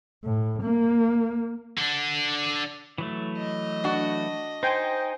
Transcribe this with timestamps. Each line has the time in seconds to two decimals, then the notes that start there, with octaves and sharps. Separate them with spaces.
0.24 A2
0.62 A#3
1.77 D3 D4
2.98 E3 F#3 A3
3.38 D#5
3.84 D4 F#4
4.63 D#4 C5 G5 G#5